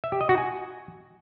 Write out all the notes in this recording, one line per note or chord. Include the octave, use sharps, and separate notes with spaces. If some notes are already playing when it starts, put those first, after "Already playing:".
E5
G4
D#5
F#4
G#5